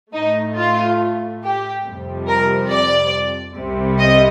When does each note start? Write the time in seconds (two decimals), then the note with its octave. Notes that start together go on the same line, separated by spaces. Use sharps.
0.13 A2 A3 D#4
0.56 F4
1.42 G4
1.85 F2 C3 G3
2.28 A#4
2.70 D5
3.56 C2 C3 G3
3.99 D#5